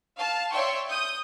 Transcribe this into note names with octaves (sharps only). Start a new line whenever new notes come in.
F5 A5
C#5 D5 E5 G5 C6 C#6
D#6 G6